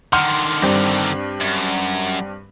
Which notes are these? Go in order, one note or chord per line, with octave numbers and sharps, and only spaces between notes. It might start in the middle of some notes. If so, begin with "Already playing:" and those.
D3 D#3 F#5 C6 F6
G2 C4 D4
F#2